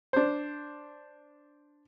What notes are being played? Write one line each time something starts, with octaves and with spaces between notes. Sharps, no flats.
D4 C5